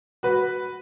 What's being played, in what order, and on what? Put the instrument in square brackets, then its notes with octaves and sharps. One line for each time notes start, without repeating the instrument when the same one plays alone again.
[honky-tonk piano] F#4 B4